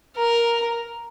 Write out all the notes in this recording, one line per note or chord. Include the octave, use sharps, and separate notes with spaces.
A#4